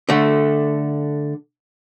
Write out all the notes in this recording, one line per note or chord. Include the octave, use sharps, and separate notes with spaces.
D3 A3